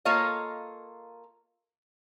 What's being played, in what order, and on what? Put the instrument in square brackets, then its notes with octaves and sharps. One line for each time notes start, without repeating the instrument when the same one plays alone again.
[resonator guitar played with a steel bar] A#3 F4 A4 C#5 D#5 F5